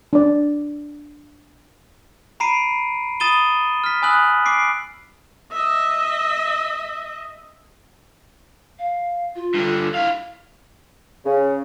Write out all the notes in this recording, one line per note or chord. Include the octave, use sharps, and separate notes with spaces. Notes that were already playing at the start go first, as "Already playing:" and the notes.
D4 D5
A#5 B5 C7 D7 D#7
B5 D#6 A6 D#7 E7 G7
F6 B6
G#5 B5 D#6 E6 F#6 F#7
D6 C7 D7
D#5 E5
F5
F4
G2 D3
E4 F5
C#3